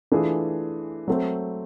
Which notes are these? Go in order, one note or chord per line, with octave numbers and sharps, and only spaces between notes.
E3 A3 D4 F4 G#4
F#3 A3 C4